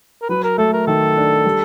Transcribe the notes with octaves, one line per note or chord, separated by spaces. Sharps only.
A#4
F#3 B4
A#4
A3 A4
A#4
D#3 A4
D4
G3